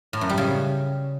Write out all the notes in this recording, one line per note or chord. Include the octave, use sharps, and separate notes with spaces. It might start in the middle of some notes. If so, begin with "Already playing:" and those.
A2
F#2
G3
C#3